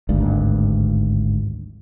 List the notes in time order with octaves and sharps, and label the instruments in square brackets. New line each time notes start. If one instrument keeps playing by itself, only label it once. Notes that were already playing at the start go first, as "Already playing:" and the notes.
[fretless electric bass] G#1 D2 G2